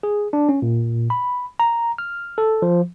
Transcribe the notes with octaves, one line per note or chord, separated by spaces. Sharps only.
G#4
D4
C#4
A#2
B5
A#5
F6
A4
F3